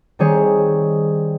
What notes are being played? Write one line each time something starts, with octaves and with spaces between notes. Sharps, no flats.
D#3 G3 C4 G#4 C#5